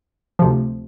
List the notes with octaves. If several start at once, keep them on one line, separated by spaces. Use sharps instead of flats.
D2 C3 F3